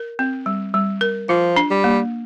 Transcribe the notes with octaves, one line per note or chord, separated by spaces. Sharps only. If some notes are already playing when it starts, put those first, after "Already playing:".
Already playing: A#4
C4
G3
G3
A#4
F3 F4
D4
G3
A#3